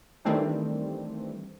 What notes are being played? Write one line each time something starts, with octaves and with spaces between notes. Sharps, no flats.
D#3 E3 G3 A3 C4 D4